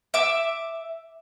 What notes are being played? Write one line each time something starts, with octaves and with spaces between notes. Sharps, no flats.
E5 D6